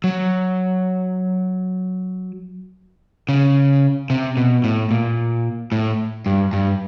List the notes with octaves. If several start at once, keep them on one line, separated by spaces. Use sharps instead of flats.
F#3
C#3
C3
B2
A2
A#2
A2
G2
G2